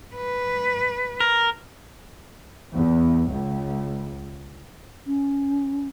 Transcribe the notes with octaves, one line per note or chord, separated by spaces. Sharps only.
B4
A#4
E2
C#2
C#4